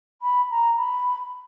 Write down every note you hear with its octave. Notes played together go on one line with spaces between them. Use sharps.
B5
A#5
B5